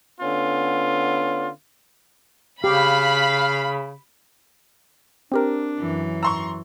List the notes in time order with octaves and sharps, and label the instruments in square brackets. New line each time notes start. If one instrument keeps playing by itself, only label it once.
[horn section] D3 B3 C#4 F4
[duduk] C#3 [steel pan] G4 [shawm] F5 [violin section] B5
[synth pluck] C4 G4 A#4 [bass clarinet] D4
[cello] F#2 E3
[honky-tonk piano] A#5 C6 C#6 [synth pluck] E6